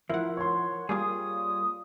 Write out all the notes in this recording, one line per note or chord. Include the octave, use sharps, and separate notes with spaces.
F3 E4 A#4 F#5
C#5 C6
G3 A#3 F4 G#4 D#6